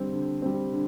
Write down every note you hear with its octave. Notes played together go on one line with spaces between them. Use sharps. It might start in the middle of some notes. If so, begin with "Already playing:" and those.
Already playing: D3 G3 C4
D3
G3 C4
D3